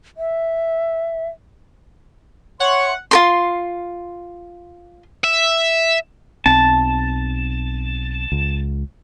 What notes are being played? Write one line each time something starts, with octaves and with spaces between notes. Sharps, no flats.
E5
C#5 E5 F#5 C6 C#6
F4 A#4 C6
E5
B1 C4 A5
C#2